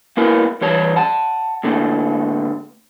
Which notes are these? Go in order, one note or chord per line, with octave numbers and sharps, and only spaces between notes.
A#3 B3 E4 A#4
E3 G3 G4 C#5 A5
F#5 A5
A2 D3 A#3